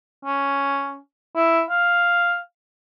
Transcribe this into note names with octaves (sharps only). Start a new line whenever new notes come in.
C#4
E4
F5